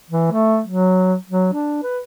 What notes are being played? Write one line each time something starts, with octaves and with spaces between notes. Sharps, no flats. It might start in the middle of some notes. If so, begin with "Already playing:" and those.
E3
A3
F#3
F#3
D4
B4